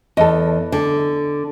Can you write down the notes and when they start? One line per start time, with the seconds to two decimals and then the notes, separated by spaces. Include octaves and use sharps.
0.17 E2 A4 D#5
0.72 D3